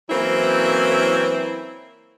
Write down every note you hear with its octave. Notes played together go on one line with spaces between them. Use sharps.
E3 F#3 A#3 C4 C#4 E4